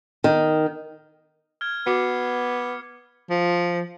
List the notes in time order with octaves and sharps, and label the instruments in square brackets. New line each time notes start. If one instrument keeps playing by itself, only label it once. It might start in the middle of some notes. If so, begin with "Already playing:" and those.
[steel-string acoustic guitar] D#3
[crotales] F6 G#6
[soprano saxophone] B3 [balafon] F#4 [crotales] D6 C7 C#7
[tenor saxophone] F3